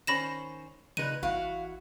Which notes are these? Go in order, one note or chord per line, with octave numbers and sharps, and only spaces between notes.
D#3 C#4 C5 B5 A#6 E7
A#2 C#3 D#4 B4 D#7
A1 E4 F#4 F5